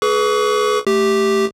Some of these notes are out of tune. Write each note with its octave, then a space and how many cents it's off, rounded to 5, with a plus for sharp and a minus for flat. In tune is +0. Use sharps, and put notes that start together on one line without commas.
G#4 +30 B4 +0 C#6 +35
A3 +0 G4 +0